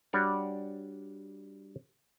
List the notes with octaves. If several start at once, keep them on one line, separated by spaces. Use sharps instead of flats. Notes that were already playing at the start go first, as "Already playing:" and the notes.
G3 D4 F#4 C#5 D5